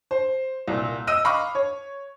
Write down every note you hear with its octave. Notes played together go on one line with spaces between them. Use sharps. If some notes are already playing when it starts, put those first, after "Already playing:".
C5
C2 A#2
D#5 E6 D#7
D#5 F5 B5 C#6 D6 F6
C#5